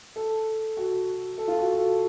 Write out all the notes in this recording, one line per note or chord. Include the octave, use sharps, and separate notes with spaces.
A4
F#4
A4
F4
F#4
F#4
A4